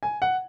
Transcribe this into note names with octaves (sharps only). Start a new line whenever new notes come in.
G#5
F#5